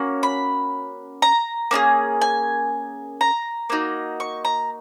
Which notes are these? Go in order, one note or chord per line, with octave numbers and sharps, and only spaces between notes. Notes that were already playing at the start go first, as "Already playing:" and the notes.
Already playing: A#3 C#4 F#4
B5
A#5
A#3 C#4 F4 G#4
G#5
A#5
A#3 D#4 F#4
C#6
A#5